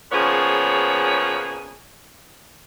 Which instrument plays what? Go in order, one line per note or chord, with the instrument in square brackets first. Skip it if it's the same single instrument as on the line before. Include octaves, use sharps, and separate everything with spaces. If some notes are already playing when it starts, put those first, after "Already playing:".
[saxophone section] A#2 C#3 F3 B3 G#4 C#5